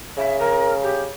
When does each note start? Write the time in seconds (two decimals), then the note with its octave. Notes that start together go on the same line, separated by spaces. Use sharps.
0.17 C#3 E5
0.39 A#4
0.83 G4